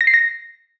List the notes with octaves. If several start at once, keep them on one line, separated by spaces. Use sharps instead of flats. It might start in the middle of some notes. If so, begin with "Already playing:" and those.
A#6
C7
A#6